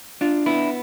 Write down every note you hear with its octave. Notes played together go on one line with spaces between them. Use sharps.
D4 F4
B3 E4